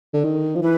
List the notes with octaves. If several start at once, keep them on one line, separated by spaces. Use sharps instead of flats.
D3
D#3
F3
E3 B4